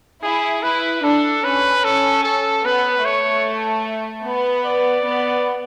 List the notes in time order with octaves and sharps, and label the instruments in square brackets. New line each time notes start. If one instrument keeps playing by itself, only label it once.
[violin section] E4 [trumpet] G#4
[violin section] E4 [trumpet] B4
[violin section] D4 [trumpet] A4
[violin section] C#4 [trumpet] B4
[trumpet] A4
A4
[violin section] B3 [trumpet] B4
[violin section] A3 [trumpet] C#5
[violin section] B3
[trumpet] D5
[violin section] B3